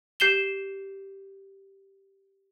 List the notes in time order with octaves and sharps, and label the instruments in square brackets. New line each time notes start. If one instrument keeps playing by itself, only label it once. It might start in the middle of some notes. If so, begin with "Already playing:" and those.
[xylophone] G4 G6 C7 E7 G7